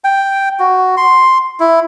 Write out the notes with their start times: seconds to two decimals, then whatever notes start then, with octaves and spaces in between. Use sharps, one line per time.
0.04 G5
0.60 F#4
0.97 C6
1.60 E4